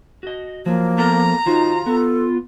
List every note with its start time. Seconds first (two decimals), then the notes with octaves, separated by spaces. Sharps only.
0.23 F#4 D#5
0.66 F3 F#3 A#3
0.98 B3 A4 A#4 A#5
1.46 D#3 D#4 F4 F#4 C5
1.86 B3 A4